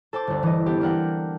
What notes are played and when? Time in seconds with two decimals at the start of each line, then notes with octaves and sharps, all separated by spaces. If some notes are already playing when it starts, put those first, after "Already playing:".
0.13 A4 C5 A5 D6
0.27 G1 D2
0.43 E3 D#5
0.66 B3 D4 G4
0.81 A#3 D4 A#4 F#5 G5